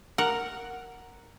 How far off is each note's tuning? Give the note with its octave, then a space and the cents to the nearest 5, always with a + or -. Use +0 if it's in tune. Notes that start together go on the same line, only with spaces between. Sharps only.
A#4 +0 F#5 +0